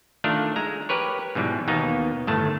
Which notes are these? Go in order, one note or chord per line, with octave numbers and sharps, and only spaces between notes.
D#3 A3 D4 F4 A#4
G#3 A#5
G4 A#4 B4 C#5
G#2 B2 E3 G3
D#2 B2 A#3 B3 D#4
G1 A2 D#3 A3 A5